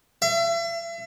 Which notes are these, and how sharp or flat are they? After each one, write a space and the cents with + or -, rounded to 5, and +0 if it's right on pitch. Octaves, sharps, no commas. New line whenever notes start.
E5 +40